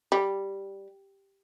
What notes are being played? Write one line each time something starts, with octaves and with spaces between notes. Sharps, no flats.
G3